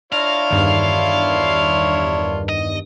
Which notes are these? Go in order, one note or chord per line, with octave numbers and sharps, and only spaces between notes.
D4 E4 F4 C#5 F5 A#6
E2 G2 D#3
D#5